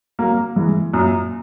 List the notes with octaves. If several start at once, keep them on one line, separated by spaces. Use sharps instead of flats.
F#3 A#3
E3 G#3
F#2 A#2